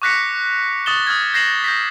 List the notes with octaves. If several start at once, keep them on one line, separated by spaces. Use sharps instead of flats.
C#6 D6 F#6 A#6 B6 C#7
C#6 D#6 A6 E7 G7
D#6 F6 G#6
G6 A#6 C7 E7 F#7
G6 A#6 B6